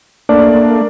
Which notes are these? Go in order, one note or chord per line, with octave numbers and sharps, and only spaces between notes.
A3 A#3 D4 D5